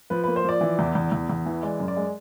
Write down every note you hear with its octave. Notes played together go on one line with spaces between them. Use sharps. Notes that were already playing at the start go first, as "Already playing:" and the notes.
F3 B4
B4
A#3
C5
F3 D5
E3
E2
E2
E2
E2
E3
G#3 D5
F#2
D5
G#3